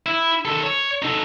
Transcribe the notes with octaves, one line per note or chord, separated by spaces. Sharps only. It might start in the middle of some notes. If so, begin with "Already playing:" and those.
E4
D#3 A4
C#5
D#4 A4